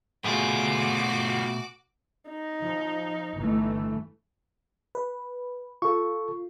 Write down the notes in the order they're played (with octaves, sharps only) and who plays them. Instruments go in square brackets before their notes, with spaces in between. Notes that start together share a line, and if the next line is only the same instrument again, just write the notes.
[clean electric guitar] B2 A3 G#4 [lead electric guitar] B3 F4 [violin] F#4 D6
[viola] D#4
[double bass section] F3
G1 E3 A3
[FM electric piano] B4
[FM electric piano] F4 [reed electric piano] A4 C#6